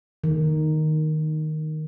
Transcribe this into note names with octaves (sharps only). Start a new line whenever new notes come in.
D#3